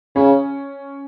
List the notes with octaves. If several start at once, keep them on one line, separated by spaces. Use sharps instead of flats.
C#3 C#4